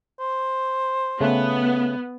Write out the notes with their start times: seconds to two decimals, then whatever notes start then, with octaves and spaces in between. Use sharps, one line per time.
0.19 C5
1.21 C#3 A3 B3